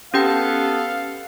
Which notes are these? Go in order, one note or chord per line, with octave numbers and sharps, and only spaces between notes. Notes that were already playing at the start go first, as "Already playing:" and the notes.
B3 C#4 G4 A4 F5 G5